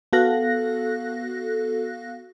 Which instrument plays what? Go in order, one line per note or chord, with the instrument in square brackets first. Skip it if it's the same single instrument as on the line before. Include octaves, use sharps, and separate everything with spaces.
[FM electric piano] B3 F#4 A4 F5 F#6 A#6